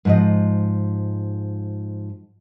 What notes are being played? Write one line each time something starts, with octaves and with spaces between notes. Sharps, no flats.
G#2 F3 D#5